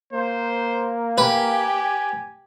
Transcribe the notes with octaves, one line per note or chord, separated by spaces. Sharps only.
A#3 C5
G4 B4 G#5